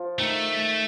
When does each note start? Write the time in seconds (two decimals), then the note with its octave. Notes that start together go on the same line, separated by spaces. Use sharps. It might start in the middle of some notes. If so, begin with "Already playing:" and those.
Already playing: F3
0.19 D#3 A3